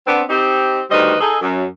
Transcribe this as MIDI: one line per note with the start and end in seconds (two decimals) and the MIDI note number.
0.06 0.23 59
0.06 0.23 60
0.06 0.23 62
0.30 0.81 60
0.30 0.81 63
0.30 0.81 67
0.90 1.15 38
0.90 1.15 51
0.90 1.15 55
0.90 1.15 71
0.90 1.15 72
0.90 1.15 75
1.20 1.36 63
1.20 1.36 68
1.20 1.36 69
1.41 1.65 42